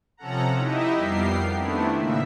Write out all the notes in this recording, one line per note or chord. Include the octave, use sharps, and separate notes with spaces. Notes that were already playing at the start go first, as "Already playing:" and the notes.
C3 F3 C#4 A4 F#5 A#5
D#4 E4 G4 D#5 E5
F2 G3 B3 G4 A#4 C7
D#3 A3 B3 C4 D4 E4
A2 C#3 A#3 E5